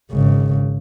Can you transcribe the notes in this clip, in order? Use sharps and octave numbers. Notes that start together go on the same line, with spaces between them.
G#1 C#3